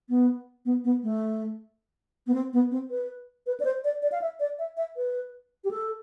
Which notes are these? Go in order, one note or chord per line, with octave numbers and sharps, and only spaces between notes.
B3
B3
B3
A3
B3
C4
B3
C4
B4
B4
D5
C5
D5
D5
F5
E5
D5
E5
E5
B4
G4
A4